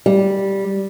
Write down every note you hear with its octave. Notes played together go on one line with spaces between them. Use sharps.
G3